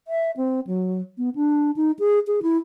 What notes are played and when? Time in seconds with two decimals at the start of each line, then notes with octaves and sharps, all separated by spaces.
0.08 E5
0.37 C4
0.67 F#3
1.18 B3
1.36 D4
1.76 D#4
1.99 G#4
2.27 G#4
2.43 E4